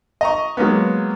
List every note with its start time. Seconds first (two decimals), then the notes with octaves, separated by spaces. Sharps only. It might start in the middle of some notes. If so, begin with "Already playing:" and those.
0.21 D#5 A#5 C#6
0.57 F#3 G#3 A#3 B3